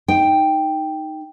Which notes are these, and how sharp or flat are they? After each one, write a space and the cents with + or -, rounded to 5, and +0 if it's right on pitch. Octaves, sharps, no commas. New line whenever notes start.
D#4 +0 G5 +0